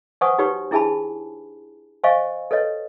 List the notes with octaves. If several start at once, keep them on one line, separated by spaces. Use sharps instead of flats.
B4 C5 F#5 G#5 C#6 D#6
D#4 F#4 G4 B4 C#5 C#6
D4 E4 G#4 G#5 A5 B5
C5 D#5 F5 G#5 C#6
A4 B4 C#5 D#5